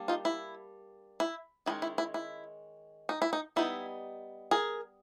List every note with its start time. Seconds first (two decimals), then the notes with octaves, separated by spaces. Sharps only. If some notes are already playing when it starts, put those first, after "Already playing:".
Already playing: G3 A#3 D4
0.08 D#4 F4
0.25 E4
1.20 E4
1.66 D#3 G#3 C#4 E4
1.82 E4
1.98 E4
2.14 E4
3.09 D#4
3.22 E4
3.33 D#4
3.56 G3 B3 D#4 E4
4.51 G#4 A#4